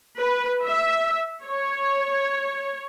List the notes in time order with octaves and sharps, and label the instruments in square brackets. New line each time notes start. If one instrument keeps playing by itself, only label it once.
[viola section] B4
E5
C#5